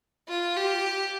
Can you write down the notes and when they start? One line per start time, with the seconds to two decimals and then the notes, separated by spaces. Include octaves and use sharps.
0.28 F4
0.57 G4